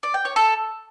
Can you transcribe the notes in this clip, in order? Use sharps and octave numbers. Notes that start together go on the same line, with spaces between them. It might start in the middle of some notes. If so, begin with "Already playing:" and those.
D5
G5
C#5
A4